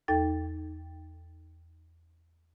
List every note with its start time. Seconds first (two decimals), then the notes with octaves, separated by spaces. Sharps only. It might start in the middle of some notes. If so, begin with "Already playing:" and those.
0.08 E2 D#4 A4 G5 A6